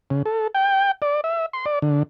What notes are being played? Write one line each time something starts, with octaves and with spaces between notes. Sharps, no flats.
C#3
A4
G5
D5
E5
C6
D5
D3